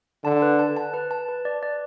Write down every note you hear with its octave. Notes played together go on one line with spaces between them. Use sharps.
D3 A5
B4
A5
A5
B4
A5
B4
D5
D5